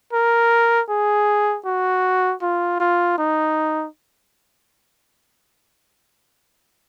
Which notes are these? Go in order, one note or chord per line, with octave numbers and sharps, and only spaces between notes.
A#4
G#4
F#4
F4
F4
D#4